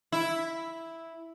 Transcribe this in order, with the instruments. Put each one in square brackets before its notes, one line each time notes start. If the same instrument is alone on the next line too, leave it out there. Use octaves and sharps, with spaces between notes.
[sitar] E4